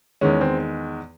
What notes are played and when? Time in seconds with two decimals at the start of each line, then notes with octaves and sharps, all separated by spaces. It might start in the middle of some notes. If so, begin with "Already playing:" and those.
0.21 E2 D#3 G#3 C#4
0.41 C4